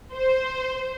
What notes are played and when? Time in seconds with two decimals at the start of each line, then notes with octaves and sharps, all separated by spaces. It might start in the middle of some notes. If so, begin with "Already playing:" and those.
0.15 C5